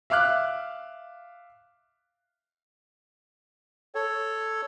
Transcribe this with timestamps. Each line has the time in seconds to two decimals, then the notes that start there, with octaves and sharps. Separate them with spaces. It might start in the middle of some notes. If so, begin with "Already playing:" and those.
0.10 E5 F5 D6 F6 F#6
3.95 A4 C#5